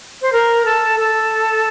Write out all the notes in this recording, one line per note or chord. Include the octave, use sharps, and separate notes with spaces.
C5
A#4
A4
A4